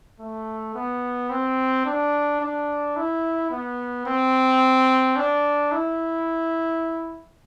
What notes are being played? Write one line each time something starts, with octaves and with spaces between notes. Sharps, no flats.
A3
B3
C4
D4
D4
E4
B3
C4
D4
E4